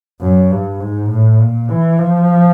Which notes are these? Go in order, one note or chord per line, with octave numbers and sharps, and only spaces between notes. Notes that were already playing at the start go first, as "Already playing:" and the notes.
F#2
G2
G#2
A2
A#2
E3
F3